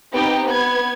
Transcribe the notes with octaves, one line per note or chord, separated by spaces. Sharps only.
B3 C4 D#4 G4 G5
B3 G#6